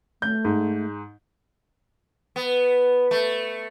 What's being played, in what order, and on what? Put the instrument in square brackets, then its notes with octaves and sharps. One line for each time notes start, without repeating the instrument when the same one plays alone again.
[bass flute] A3 [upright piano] G6
[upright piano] G#2
[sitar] B3
A3